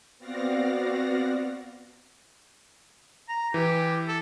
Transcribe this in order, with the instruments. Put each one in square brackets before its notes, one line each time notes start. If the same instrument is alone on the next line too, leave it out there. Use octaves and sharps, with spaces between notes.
[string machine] B3 C4 F#4 D5 F5 A#6
[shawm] A#5
[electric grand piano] E3 [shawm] G4
[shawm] A4